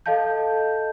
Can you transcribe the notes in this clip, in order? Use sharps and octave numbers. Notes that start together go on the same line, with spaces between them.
A4 D#5 F5 A5 G6